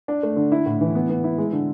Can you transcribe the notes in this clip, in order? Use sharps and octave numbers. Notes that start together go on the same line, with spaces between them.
D4
A3
D3
E4
A2
E3
B3
B3
E4
G#3
D3